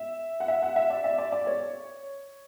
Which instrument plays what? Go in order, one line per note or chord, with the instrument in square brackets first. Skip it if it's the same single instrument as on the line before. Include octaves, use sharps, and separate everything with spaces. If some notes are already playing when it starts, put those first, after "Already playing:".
Already playing: [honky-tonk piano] E5
F#5
E5
F#5
E5
D5
E5
D5
D5
C#5